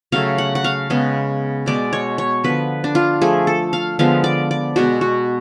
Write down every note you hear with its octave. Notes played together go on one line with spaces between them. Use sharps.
C#3 F#3 A3 F5
F#5
F#5
F5
C#3 G#3 B3
B2 G#3 B3 D5
C#5
C#5
D3 F3 B3 B4
D4
F4
F3 A3 G#4
A4
F5
D3 F3 G#3 B3 F5
D5
D5
B2 G#3 B3 F#4
F#4